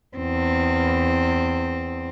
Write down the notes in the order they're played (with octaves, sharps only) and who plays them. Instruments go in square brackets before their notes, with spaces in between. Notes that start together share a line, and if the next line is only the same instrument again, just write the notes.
[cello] E2 C4